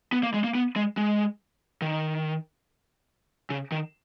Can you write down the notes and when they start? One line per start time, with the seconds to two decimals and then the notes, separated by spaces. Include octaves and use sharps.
0.12 B3
0.23 A#3
0.34 G#3
0.44 A#3
0.55 B3
0.76 G#3
0.97 G#3
1.82 D#3
3.50 C#3
3.72 D#3